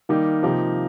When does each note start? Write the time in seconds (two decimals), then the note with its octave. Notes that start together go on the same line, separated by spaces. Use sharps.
0.09 D#3 G3 A#3 D#4 G4
0.43 C3 F3 A#3 D#4 G4